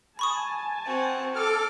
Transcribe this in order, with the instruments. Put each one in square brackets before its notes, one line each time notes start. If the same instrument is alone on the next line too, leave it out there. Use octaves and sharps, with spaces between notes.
[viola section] G#5 A5 [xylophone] B5 C#6 D#6
[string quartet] C4 F#4
[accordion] A4 F6 [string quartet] D6